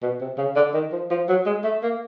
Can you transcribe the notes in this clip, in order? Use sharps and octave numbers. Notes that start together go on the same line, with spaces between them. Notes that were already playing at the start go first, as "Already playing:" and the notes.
B2
C3
C#3
D3
D#3
F3
F3
F#3
G#3
A3
A#3